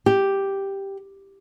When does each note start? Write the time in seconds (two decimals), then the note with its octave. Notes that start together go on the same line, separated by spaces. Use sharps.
0.06 G4